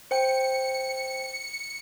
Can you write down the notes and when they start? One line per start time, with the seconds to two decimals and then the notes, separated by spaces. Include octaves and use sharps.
0.11 C5 G5 C#7